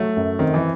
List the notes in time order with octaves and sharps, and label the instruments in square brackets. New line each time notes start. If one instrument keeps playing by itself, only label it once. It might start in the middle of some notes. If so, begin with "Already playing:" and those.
Already playing: [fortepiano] F#3 [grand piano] A3
[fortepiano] F#2
[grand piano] D#3 [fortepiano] C4
[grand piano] E3